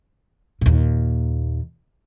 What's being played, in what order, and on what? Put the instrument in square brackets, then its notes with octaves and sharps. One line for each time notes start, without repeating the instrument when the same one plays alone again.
[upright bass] D#2 A#2